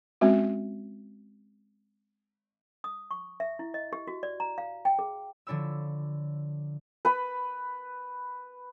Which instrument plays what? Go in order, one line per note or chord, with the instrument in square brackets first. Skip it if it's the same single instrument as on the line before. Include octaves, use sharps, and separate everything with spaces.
[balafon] G#3 C4 C#4 F#4
[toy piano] D#6
C#6
E5
E4
D#5
G4
F#4
D5
A#5
F5
G5
G#4
[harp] D3 F3 D4 C#5 B5 E6
[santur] B4 B5